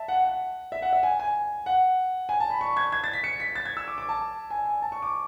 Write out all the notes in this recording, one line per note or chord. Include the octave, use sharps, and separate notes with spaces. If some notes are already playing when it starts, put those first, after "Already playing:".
Already playing: E5 A5
F#5
F#5
E5
F#5
E5
G#5
G#5
F#5
G#5
A5
B5
C#6
G#6
G#6
A6
B6
C#7
B6
A6
G#6
E6
D6
D6
A5
G#5
G#5
A5
C#6
D6